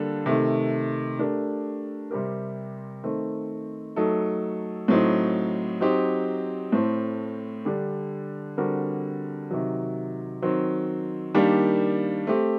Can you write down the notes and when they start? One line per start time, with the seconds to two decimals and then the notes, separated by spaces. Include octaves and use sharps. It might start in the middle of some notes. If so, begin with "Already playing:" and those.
Already playing: D3 G3 A#3 D4 A4
0.26 C3 D#3 A3
1.19 A3 D4 G4 A#4
2.11 C3 G3 C4 G4 A#4
3.04 D#3 A3 C4
3.96 F#3 A3 D#4 A4
4.88 A2 F#3 C4 D#4
5.81 F#3 C4 D#4 G4
6.72 A2 A3 C4
7.65 D3 G3 D4 G4
8.57 D3 G3 C4 F#4 A#4
9.51 C3 D#3 F#3
10.42 D#3 F#3 C4
11.34 D#3 G3 A#3 D4 G4
12.27 A3 C4 G4